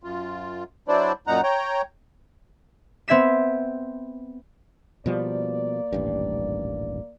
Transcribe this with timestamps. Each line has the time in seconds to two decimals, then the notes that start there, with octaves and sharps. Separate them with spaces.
0.03 F#2 F4
0.88 F#3 D4 E4 C5 D5
1.27 F#2 A#2 D#4 F#5 A#5
1.43 C#5 G5 A#5
3.08 B3 C4 E5 G#6 B6 E7
5.06 B2 F3 G3 A#3 D5
5.93 D#1 A1 G2